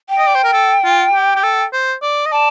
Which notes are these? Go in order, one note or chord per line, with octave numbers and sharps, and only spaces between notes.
G5
D#5
D5
C5
A#4
A4
F4
G4
G4
A4
C5
D5
D#5
D5 A5